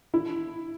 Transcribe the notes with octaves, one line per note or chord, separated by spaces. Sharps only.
E4